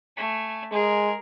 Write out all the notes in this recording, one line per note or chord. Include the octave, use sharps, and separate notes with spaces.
A3 G#5
G#3 G#4 A#4